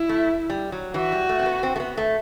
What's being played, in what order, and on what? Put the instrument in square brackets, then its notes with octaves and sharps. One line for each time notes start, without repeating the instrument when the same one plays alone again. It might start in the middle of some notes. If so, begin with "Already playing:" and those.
Already playing: [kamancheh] E4
[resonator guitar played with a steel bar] A3
G3
F#3
[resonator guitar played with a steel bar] E3 [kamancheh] F#4
[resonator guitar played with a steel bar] G3
A3
C4
B3
C4
A3
B3
A3